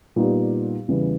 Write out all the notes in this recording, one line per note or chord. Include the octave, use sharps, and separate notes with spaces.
A#2 G3 B3 D#4 G4
E2 C#3 E3 G3